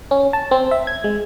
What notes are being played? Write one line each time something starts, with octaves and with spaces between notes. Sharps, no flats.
C#4
A5
C4
E5
G#6
G#3